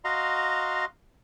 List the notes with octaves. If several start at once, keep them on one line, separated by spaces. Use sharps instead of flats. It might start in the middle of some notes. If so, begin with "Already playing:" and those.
F#4 D#5 F5 A#5 C6